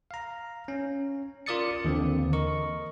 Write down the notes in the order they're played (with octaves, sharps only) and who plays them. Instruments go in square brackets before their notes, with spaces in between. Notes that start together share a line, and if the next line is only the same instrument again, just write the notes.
[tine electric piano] F5 A#5
C#4
F4 A#4 D5 D#6 A6 C#7
D#2 D3 E3 C4
A#4 D#5 C#6